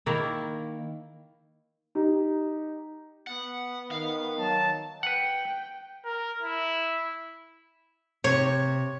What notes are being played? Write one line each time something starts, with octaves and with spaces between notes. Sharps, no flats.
D#3 A#3 E4
D#4 G4
B3 F#5
D#3 F5
F#3 A5
B4 F#5 G5
A#4
E4
C3 C#5